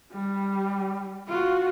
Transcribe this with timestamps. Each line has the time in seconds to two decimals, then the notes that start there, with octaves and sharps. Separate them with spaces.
0.12 G3
1.29 F4 F#4